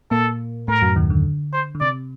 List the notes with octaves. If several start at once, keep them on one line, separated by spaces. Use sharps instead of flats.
A#2 A#3 A4
A2 A3 A#4
F#2 F#3
D#2 D#3
D3
C5
D3
C3 D5